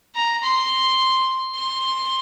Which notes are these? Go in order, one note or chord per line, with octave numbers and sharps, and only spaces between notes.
A#5
C6
C6